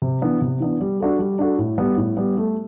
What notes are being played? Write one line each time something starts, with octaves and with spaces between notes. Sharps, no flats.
C3
E3 B3 D4
C3
E3 B3 D4
G3
D4 F#4 A4
G3
D4 F#4 A4
A2
G3 B3
A2
G3 B3
A3